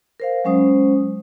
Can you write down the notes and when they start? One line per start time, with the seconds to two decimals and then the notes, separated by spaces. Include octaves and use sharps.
0.20 A#4 C5 F5
0.45 F#3 G#3 C#4 C5 D#6